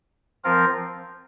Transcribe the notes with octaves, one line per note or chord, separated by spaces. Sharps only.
F3 C4 F4 A#4